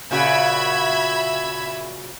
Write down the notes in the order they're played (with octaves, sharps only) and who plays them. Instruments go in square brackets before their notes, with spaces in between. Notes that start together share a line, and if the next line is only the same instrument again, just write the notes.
[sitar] A#2 C#3 F#4 [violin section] E5 B5 G#6